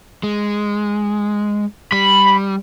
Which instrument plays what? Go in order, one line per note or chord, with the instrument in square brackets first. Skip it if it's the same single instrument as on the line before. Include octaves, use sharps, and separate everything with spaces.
[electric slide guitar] G#3
[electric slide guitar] G3 [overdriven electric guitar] B5